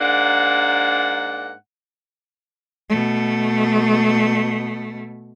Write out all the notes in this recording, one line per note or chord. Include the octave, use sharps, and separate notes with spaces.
G#2 A#3 D4 F#5
B2 A3